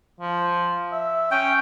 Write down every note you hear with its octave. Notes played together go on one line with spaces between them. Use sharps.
F3
E5
C#4 G5